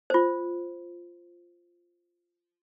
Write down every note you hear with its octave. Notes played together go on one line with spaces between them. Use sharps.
F4 C5